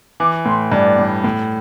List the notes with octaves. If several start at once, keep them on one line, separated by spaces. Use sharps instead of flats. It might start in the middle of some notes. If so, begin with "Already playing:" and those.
E3 D6
A2 C6
G2 D5
A2
A2